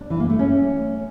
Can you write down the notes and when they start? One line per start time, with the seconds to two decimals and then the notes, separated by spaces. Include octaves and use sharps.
0.01 D4
0.10 E3
0.20 A#3
0.30 A3
0.39 C#4